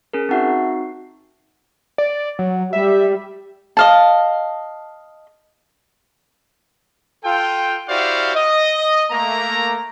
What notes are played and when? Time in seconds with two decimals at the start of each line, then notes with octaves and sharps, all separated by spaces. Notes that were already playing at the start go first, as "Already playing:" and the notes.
0.13 C#4 G#4 A#4
0.29 C4 D#4 F#4 E5 F#5 A5
0.72 C7
1.98 D5
2.39 F#3
2.73 G3 E5
3.77 D#5 F5 A5
7.24 F4 A4 G5
7.88 E4 F#4 G4 C5 D5 F5
8.35 D#5
9.11 A3 A#3 A#5